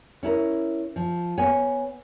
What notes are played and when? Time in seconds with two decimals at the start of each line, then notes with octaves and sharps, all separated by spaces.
0.23 C#4 E4 A#4
0.96 F3
1.38 B3 C#5 G#5